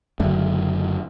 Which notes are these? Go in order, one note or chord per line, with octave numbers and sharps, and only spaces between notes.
F#1 F#2 D3 A3